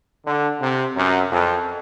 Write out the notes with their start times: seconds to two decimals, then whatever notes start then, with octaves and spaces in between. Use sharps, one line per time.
0.26 D3
0.61 C3
0.96 F#2
1.32 F2